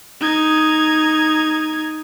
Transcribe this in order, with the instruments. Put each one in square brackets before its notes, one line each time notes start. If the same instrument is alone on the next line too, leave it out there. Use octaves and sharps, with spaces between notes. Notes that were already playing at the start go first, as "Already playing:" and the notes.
[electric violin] D#4 G#6